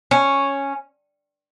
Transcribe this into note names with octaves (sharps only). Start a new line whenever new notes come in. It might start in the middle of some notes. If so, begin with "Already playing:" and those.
C#4